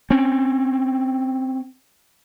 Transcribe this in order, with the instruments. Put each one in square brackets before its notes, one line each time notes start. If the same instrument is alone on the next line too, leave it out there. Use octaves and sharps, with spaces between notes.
[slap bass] C4 C#4